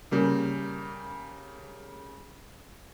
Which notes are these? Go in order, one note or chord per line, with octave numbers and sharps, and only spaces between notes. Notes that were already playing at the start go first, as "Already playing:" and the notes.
C#3 G3 A#3